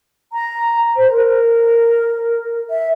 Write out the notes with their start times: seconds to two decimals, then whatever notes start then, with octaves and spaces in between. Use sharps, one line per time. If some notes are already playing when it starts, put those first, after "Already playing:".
0.33 A#5
0.96 C5
1.11 A#4
2.70 E5